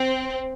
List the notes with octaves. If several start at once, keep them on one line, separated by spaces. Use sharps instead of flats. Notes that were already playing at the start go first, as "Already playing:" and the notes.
Already playing: C4